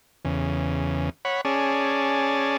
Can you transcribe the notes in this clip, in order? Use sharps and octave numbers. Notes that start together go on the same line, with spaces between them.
E2 C#3
C#5 F#5 B5
C#4 G#4 D5 A5